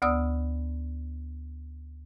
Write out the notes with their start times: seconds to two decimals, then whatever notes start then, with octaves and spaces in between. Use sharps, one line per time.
0.02 D2 B3 D5 D#6 E6